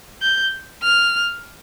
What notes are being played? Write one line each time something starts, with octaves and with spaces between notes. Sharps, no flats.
G6
F6